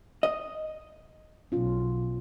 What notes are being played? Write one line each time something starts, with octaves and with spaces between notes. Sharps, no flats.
D#5
B1 C#4 F4